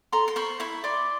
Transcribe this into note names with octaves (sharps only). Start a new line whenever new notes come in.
A4 A#5 C6
C6
C5 B5 C#6
E4 B5 C#6
D5 C6 D6